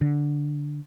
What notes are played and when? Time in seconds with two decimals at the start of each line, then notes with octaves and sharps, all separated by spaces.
0.01 D3